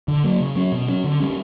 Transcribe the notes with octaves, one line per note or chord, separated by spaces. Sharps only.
D3
F#3 A#3
C#3
F#3 C#4
B2
F#3 C#4
D3
G3 C#4